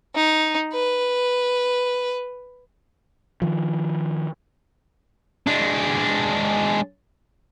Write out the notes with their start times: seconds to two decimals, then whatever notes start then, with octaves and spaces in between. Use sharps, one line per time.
0.15 D#4
0.73 B4
3.42 D#3 F3
5.47 G#3 D4